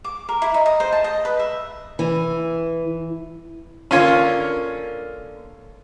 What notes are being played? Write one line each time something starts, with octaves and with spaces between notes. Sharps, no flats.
D6
A#4
E4
D#4
D#5
C5
A5
D#5
B4
E5
E3
D3 A#3 C#4 F4 A#4 C#5